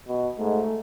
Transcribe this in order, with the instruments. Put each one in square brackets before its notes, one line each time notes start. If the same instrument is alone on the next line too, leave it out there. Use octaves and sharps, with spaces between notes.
[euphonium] B2
[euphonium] G#2 [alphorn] A3